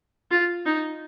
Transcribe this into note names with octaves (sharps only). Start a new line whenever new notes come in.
F4
D#4